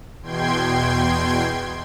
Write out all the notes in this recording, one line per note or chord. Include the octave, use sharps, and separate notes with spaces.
E2 B2 G5 C6 G#6